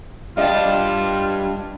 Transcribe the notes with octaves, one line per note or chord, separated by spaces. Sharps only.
G2 F4 D5 D#5 G5 A5